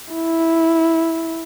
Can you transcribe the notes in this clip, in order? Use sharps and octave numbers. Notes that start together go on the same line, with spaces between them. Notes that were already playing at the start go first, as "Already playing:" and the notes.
E4